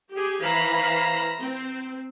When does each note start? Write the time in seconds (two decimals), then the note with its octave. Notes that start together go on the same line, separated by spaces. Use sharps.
0.12 G4 G#4
0.42 E3 C5 F5 A#5 B5
1.40 C4